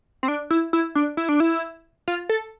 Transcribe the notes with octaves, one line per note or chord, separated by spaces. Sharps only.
C4
D4
E4
E4
D4
E4
D4
E4
F4
A4